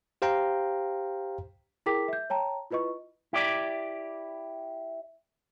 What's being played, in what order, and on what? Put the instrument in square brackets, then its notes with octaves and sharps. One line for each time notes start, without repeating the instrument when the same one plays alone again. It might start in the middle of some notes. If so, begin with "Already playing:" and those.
[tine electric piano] G4 C5 F5 G5 A#5
[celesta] E4 G#4 A#4 G5 D6 B6
E5 G6
C#5 G5 A5 A#5
E4 F4 B4 D#5 C#6
[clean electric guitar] E4 G4 D5